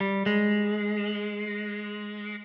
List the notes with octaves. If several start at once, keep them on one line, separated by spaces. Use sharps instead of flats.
G3
G#3